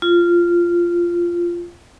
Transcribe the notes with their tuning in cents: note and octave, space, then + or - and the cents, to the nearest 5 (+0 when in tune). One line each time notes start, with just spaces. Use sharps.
F4 -10